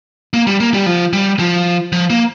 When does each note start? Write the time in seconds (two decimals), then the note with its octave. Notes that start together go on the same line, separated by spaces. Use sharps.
0.33 A#3
0.47 G3
0.60 A#3
0.74 G3
0.86 F3
1.13 G3
1.39 F3
1.92 F3
2.10 A#3